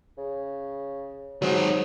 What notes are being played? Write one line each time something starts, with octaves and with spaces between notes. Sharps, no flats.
C#3
C3 D#3 F#3 G#3